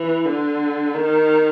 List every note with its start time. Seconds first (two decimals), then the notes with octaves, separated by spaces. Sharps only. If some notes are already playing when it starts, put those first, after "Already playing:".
Already playing: E3
0.26 D3
0.94 D#3